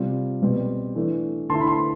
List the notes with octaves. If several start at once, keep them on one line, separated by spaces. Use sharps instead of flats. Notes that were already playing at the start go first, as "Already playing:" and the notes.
Already playing: C3 G3 C4 F4
B2 G3 C4
E3 A3 D4
D3 A3 E4 A5 C6
B5
A5 C6